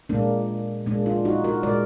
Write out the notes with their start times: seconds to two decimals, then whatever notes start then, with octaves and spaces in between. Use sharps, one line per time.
0.09 A#2 G#3 A#3 D4
0.86 A#2 G#3 A#3 D4
1.06 D4 F4
1.25 D#4 F#4
1.44 F#4 A#4
1.63 A#2 G#3 A#4 D5